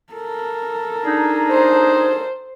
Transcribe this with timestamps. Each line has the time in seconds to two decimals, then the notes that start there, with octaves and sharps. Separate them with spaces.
0.13 A4 A#4
1.05 D4 D#4 G#4
1.52 C5